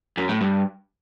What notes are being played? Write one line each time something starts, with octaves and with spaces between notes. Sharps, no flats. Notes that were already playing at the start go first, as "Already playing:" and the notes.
F#2
A2
G2